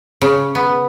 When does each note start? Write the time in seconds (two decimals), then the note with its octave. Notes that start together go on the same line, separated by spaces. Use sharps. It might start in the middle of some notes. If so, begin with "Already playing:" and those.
0.22 C#3
0.55 B3